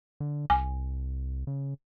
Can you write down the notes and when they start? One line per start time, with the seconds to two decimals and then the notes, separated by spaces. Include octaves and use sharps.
0.20 D3
0.50 C2 G#5
1.47 C#3